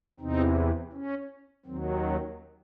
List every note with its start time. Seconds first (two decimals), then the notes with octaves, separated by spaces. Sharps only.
0.20 E2 C3 E3 C4 D#4
0.93 C#4
1.66 D#2 D#3 F#3 C4
2.02 C#4